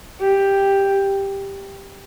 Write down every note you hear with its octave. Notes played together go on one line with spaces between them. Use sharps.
G4